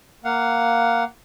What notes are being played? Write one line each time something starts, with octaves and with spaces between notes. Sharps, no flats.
A#3 F5 F#5